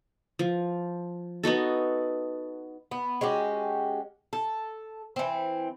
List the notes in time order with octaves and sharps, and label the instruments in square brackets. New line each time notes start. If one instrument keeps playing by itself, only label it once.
[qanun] F3
B3 D#4 F#4 A4
[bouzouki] B3
G#3 C#4 F#4 G4
A4
E3 C4